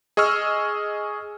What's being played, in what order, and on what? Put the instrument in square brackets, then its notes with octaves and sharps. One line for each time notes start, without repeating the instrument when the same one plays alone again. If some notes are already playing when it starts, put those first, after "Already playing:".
[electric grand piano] G#4 D#5 C#6 E6 F6